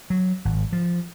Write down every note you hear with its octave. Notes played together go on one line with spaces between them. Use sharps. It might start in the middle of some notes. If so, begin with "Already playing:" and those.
F#3
G#1
F3